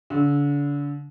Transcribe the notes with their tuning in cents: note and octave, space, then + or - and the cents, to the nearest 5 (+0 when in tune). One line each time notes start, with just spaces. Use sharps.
D3 -35